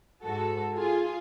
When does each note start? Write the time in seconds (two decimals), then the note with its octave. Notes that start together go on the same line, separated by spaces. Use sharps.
0.24 G#2 G#3 F#4 A4
0.76 F4 G#4